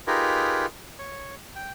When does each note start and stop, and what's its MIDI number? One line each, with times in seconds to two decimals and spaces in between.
0.07 0.66 63
0.07 0.66 65
0.07 0.66 67
0.07 0.66 68
0.07 0.66 70
0.07 0.66 71
0.99 1.35 73
1.56 1.72 79